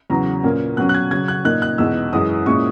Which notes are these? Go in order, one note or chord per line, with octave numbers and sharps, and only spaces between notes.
E2 C#3 F#3 A#5
A#2 A#3 C#4
B2 F#3 C#4 F#6
F#6
G#6
C#3 F#3 C#4 G#6
F#6
A#2 A#3 D#4 F#6
F#6
E2 B2 G#3 D#4 E6
F#2 E3 G#3 D#6
A#2 G#3 C#4 E4 C#6